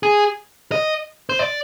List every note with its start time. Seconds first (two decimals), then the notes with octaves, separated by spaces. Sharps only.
0.03 G#4
0.72 D#5
1.29 C5
1.39 D5